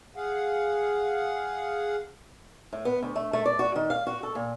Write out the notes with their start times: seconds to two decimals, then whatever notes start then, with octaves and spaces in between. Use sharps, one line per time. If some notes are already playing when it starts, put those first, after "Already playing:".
0.16 G#4 F5 F#5
2.73 A2
2.85 B3
3.02 D2
3.16 A3
3.33 A3
3.46 D5
3.59 F#4
3.76 D#3
3.90 F5
4.07 F#4
4.23 A4
4.35 A#2